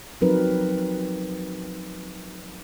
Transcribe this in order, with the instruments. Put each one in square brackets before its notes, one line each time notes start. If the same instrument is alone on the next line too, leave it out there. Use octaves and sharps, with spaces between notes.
[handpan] F3 F#3 C4 D#4 A#4 B4